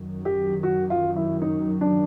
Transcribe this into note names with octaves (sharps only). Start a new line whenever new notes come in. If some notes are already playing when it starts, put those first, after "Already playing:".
Already playing: F#2 D#3 F#3
G4
F#4
F4
E4
D#4
D4